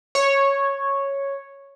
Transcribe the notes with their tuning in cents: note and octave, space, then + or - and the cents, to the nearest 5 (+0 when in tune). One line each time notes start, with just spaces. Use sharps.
C#5 -5